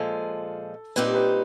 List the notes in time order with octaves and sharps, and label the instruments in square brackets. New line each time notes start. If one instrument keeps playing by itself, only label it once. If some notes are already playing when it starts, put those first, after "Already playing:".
Already playing: [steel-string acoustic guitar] A#2 F3 G#3 [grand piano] A4
[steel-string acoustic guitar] A#2 G3 C4 D#4 G4 [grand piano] B4
[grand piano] B4